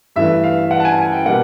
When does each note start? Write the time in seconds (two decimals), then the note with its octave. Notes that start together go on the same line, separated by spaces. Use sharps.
0.16 G2 E3 A3 E5
0.44 F5
0.71 F#5
0.80 A5
0.85 G#5
0.98 G#5
1.12 G5
1.26 B2 G3 A#3 F#5